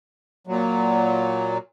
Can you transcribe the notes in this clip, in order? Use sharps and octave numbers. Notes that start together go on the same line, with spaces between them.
A#2 F#3